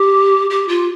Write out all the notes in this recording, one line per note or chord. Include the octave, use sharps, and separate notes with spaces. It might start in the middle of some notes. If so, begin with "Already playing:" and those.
Already playing: G4
G4
F4